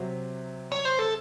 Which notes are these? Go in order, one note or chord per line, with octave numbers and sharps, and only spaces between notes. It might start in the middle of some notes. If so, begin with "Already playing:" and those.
Already playing: C3 F#3 C4
C#5
C5
A4